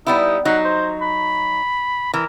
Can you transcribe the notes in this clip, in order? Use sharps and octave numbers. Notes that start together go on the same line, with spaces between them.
G3 B3 D#4 E4
F#3 D#4 F#5
C5
B5
E3 A#4